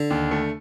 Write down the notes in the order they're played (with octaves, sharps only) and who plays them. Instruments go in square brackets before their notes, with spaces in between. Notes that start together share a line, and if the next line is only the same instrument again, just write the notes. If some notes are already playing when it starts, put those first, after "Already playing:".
Already playing: [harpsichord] D3
[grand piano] D#2
A3